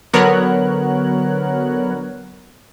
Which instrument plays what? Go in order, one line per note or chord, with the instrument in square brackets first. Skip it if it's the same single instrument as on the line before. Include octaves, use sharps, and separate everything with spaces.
[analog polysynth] D3 F#3 B3 A#4 C#5 F#6